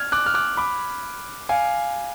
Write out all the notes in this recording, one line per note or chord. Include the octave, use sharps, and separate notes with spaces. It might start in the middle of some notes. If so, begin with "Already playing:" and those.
Already playing: F6 G#6
D6 F#6
F6
D6 F#6
B5 D6
F5 G#5